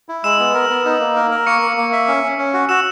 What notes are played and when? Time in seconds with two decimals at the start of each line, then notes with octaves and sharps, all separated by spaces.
0.09 E4
0.24 G#3 E6 E7
0.39 B3
0.54 A#4
0.70 B3
0.85 D#4
1.00 A#3
1.16 A#4
1.31 A#4
1.46 A#3 C#6 C#7
1.62 A#3
1.77 A#3
1.92 E5
2.08 C#4
2.23 C#4
2.38 C#4
2.54 F#4
2.69 F#4 E6 E7